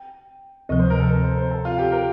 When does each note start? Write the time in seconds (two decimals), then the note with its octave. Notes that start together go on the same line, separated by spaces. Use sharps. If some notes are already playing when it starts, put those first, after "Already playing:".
Already playing: G5
0.69 D2 C3 F3 D#5
0.79 C5
0.90 A#4
1.00 A4
1.10 A#4
1.24 C5
1.37 C5
1.51 A4
1.65 F4
1.78 G4
1.92 A#4